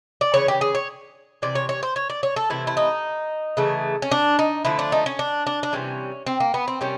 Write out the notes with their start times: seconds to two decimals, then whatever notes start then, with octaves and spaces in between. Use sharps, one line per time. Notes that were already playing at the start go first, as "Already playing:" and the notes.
0.21 D5
0.34 C#3 E3 C#5
0.48 G4
0.61 G#4
0.75 C#5
1.42 C3 E3 D5
1.55 C#5
1.69 C#5
1.83 C5
1.96 C#5
2.10 D5
2.23 C#5
2.36 A4
2.50 C3 E3 A3 E4
2.67 E4
2.77 D#4
3.57 C#3 E3 A3
4.02 C#4
4.12 D4
4.39 D#4
4.65 D3 F3 A3 E4
4.79 D4
4.92 D#4
5.06 C#4
5.19 D4
5.47 D4
5.63 D4
5.73 C3 E3 G3 C#4
6.26 C4
6.40 A#3
6.54 B3
6.68 C4
6.81 C3 D#3 G3 C#4